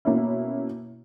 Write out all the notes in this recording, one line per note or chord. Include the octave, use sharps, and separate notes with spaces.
B2 A#3 C#4 E4